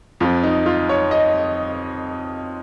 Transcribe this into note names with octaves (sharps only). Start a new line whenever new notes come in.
F2 F3 F4
D#4
F4
C#5
D#5